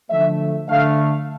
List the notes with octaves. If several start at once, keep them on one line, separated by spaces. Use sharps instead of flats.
D3 F3 A3 E5
D3 A3 F5